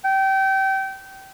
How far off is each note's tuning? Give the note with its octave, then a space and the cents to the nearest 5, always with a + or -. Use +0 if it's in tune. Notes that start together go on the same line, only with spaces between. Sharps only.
G5 -25